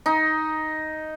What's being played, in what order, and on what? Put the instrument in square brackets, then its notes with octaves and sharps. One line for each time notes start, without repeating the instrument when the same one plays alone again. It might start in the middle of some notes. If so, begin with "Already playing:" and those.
[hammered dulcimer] D#4